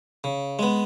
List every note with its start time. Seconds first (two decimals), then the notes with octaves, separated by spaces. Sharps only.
0.24 C#3
0.59 G#3 B3